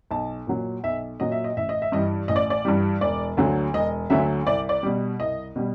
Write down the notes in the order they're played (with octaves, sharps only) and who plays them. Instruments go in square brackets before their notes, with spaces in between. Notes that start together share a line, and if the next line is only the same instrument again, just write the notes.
[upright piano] B1 A5
A#2 F#3
B1 E5
A#2 F#3 D#5
E5
D#5
A1 E5
D#5
E5
G2 E3 G3 D#5
A1 D#5
D5
D5
G2 E3 G3
E1 D5
D2 D3 F#3
E1 D#5
D2 D3 F#3 E5
C2 D5
D5
B2 G3
C2 D#5
B2 G3